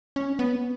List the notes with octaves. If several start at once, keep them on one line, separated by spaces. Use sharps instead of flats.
C#4
B3